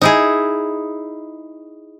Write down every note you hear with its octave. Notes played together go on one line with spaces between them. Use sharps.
D#4 E4 G#4